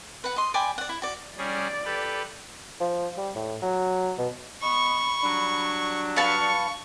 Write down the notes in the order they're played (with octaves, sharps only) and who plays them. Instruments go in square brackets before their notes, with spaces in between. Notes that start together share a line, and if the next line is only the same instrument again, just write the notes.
[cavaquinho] B4 F#5
D#5 C6
D5 G5 G#5 B5
D5 F#5
E4
F#4 D5
[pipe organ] G3 C#4 G#4 [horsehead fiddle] D5
[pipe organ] G4 A4 B4
[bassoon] F3
G3
A2
F#3
B2
[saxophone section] B3 D#5 [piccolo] B5 [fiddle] C#6
[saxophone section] F#3 G3 D4
[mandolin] B4 F5 A5 [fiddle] C#6 [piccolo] C#7